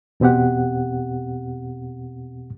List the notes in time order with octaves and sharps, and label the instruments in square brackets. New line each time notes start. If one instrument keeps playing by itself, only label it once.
[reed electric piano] E2 B2 C4 G4 F#5